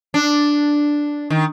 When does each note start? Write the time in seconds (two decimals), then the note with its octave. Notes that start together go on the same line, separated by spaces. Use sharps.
0.14 D4
1.30 D#3